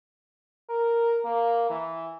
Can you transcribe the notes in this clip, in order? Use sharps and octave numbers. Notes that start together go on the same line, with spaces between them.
A#4
A#3
E3